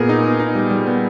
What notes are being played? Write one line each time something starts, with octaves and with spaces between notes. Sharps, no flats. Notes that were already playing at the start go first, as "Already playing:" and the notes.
Already playing: A#2 B3 G#4 A#4
D#4
B3
D#4
G3
G3
B3